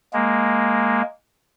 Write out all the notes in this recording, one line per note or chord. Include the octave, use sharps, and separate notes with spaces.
G#3 A#3